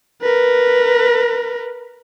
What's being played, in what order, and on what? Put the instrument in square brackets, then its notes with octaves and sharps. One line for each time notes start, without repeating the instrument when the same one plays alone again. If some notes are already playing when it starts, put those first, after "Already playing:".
[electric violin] A#4 B4